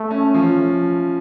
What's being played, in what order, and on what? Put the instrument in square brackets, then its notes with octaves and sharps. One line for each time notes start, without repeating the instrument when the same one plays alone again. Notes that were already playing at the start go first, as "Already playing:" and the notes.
Already playing: [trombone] A3
[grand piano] C#4
F3